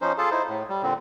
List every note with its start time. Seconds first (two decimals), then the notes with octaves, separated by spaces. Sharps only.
0.01 F3 C#4 D#4 C5
0.18 F4 G#4 A4 F5 A5
0.31 D#4 E4 C5
0.48 A2
0.69 G3
0.83 A#2 D3 C4